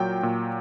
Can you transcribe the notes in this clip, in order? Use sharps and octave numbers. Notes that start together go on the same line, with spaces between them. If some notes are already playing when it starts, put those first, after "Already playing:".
Already playing: A#2 F#3 G5
A#2